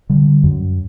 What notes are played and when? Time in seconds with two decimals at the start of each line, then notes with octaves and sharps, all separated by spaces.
0.09 D3 G3
0.43 F#2